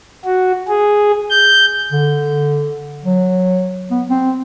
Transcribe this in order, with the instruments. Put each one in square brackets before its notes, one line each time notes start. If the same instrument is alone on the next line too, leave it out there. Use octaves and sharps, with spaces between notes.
[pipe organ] F#4
G#4
G6
[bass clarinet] D3
F#3
B3
C4